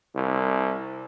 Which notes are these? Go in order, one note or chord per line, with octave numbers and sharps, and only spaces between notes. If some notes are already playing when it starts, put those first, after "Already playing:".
C2